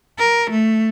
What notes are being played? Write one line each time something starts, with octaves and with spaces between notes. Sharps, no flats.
A#4
A3